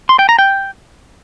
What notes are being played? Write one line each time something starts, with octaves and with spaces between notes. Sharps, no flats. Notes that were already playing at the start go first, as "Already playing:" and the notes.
C6
G5
A#5
G5